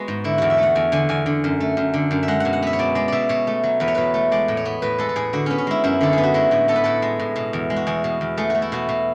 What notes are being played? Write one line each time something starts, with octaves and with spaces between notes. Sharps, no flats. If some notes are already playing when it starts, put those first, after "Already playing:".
Already playing: G#3 B3 F#4
G#2
D3 E4
E2 F#4
E5
A3 F#5
E2 G#5
D3 G#5
E2 G#5
D3
F#2
A3
F#2
D3
F#2
E5
G#3 F#5
B2 F#5
F#5
B3 E5
C#5
B2 D5
G#3 D5
B2 D5 E5
B2 C#5
A3
F#3
E2 B4
C#5
B2 B4
A3
G#3 D5
A2
C#5
B3
A2 B4
G#3 A4
A4
A2 G#4
D3 F#4
B3 C#4
C#4
G#3 E4
F#2 E4
D3 A4
B3 G#4
F#4
G#3 E4
A2 F#4
B3 A4
B4
A2 A4
G#3
A2
B2
E2
G#3
F#4
E2 G#4
B2
E2
A3 G#4
A3 F#4
E4
B2 F#4
B2